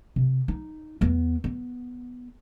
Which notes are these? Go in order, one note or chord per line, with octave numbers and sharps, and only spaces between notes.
C3
D#4
E2 B3
B3